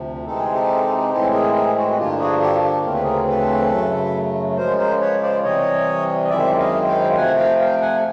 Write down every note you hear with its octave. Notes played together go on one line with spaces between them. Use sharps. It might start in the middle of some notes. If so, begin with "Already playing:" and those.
Already playing: D2 C3 F3
C3 E3 G#3 C4 D#4 A4
G#4
G4 A4
A2 E3 G#3 C4 E4 G4 A4
G#4 A#4
G#4 A#4
E4 F#4
F#4
G2 D3 F3 A#3 D4 F4 G4
F#4 G#4
G4 A4
G4 A4
D2 C#3 E3 A3 C4 A#4
B4
G#4 A#4
A4 B4
F#2 C#3 F#3 A3
C#3 F3 G#3 A#4 C5
A#4 C5
B4 C#5
C5 D5
C3 E3 G3 C#5 D#5
D#5
F#2 D#3 G#3 C4 E4 D5 E5
D#5 F5
F5 G5
C3 F3 A3 F#5 G#5
F5 G5
F5 G5
F#5 G#5